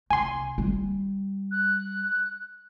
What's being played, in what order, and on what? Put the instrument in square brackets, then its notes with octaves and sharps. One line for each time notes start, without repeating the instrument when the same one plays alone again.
[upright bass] C2 [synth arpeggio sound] G#5 C6
[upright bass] G3
[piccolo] F#6